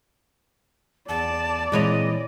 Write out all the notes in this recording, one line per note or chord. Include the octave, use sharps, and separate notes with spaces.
E2 D5 A5
A#2 E3 G#3 C4 C#5 D#5